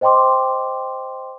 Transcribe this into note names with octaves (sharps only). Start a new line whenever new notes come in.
C5 D#5 G5 A#5 C6 D6